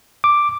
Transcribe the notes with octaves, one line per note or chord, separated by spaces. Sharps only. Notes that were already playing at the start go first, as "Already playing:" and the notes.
D6